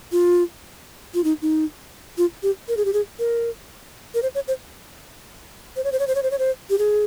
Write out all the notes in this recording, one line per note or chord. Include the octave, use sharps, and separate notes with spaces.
F4
F4
D#4
D#4
F4
G4
A#4
G#4
G4
G#4
A#4
A#4
C5
C#5
C5
C5
C#5
C5
C#5
C5
C#5
C5
C#5
C5
G4
G#4